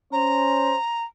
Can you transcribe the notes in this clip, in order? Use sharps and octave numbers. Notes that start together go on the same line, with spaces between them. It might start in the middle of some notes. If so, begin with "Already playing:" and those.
C#4 C5 A#5